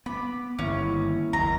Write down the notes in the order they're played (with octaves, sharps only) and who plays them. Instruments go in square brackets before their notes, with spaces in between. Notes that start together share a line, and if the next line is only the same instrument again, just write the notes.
[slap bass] B3 [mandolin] B5 [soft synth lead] D6
[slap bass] G1 D#3 A#3 [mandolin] C#4 [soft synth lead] E4
[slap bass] F#1 D#2 [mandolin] A#5